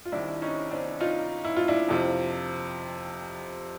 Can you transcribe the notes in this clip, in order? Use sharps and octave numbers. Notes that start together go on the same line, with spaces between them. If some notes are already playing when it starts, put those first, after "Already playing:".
F4
C2 C3 D#3 D4 E4
C#4 D#4
C4 D4
D#4 F4
E4
F4
D4 E4
F2 C3 F3